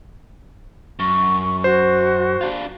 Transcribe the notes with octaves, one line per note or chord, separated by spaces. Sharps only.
F#2 C#6
F#4 C5
D4 F4